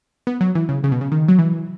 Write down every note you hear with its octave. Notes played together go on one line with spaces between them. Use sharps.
B3
F#3
E3
C#3
C#3
B2
C#3
D#3
F#3
E3